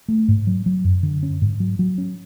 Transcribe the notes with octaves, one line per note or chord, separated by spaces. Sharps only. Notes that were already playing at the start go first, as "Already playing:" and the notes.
A3
G#2
F#3
F#3
F#2
D3
C#4
G#2
F#3
F#3
C#4